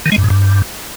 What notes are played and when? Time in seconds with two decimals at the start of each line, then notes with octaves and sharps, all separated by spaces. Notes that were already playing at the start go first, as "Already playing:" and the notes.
0.06 D#3
0.12 G#3
0.18 G2
0.24 G#2
0.30 G2